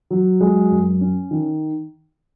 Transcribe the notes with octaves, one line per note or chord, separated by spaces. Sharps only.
F#3
G#3
F#2
C#4
D#3